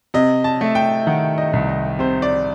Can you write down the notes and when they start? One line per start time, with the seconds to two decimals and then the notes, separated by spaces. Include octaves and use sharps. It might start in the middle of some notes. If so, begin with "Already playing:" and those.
0.14 C3 D#5
0.44 A5
0.61 A3
0.75 G5
1.07 D#3 F#5
1.38 D#5
1.53 C2
1.69 D#5
1.99 C3 C5
2.22 D5